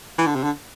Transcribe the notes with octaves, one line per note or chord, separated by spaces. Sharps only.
E3
D3
C3
D3